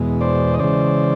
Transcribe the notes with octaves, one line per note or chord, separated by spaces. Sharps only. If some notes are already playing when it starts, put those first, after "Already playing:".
Already playing: E2 B2 G#3
C5 D5
D#5
C#3 E3 G#3 C5 D5